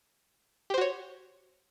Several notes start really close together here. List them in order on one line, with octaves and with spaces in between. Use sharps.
G4 C5 F#4 C#5